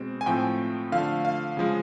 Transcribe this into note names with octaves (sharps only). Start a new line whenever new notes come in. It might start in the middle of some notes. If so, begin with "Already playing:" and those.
Already playing: B2 G#3 C4
G#5
A2 F3 A3 C4 G5
D3 F3 A3 F5
F5
C#3 F3 G#3